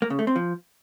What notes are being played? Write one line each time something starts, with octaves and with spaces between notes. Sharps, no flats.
A#3
C#3
A3
C4
F3